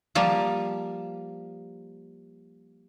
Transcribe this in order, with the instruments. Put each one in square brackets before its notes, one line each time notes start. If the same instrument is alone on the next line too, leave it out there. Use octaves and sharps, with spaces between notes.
[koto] F3 G3 A#3